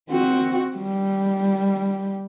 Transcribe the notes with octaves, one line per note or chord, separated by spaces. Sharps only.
C4 F#4
G3